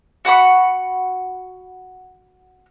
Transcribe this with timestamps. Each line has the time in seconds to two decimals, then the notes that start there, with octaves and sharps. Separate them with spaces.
0.25 F#4 F#5 B5 C#6